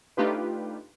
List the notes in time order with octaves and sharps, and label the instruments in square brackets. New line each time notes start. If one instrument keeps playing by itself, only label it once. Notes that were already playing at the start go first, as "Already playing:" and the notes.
[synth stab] A3 D4 D#4 F4 G4 B4